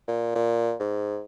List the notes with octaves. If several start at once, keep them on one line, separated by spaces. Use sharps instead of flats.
A#2
A#2
G#2